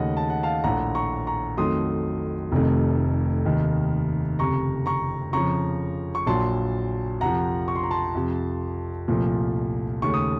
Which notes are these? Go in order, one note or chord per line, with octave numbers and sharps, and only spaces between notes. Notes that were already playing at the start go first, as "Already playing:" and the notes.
Already playing: D#2 C#3 A3 D#5 F#5
A5
F#5
F5 A5
A#1 A2 A3 F#5 A#5
A#5 C#6
A#5 C#6
F2 D#3 F#3 A3 C6 D#6
F1 F2 C3 D#3 A3
F1 D#2 D#3
F#1 F2 C3 A#5 C#6
A#5 C#6
F2 C#3 F3 A#5 C#6
C#6
A#1 A#2 F#3 A5 C6
F2 C3 F3 F#5 A#5
C#6
C6
A#5
A5 C6
F2 C3 F3
C2 A#2 F3 A3
D#2 C#3 A3 C#6
D#6